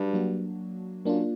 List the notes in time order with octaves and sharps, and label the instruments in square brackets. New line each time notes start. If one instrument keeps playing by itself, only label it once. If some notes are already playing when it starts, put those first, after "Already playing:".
Already playing: [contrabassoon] G2 [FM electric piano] F#3 F#4
[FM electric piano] F#3 A#3 D4 F#4
[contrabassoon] F#2 [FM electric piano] A#3 D4 F4